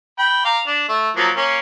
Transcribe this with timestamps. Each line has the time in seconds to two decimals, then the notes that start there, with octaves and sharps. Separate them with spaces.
0.19 G5 B5
0.45 F5 A#5 D6
0.67 D4
0.89 A3
1.16 F3 F#3 A#3
1.37 A#3 C#4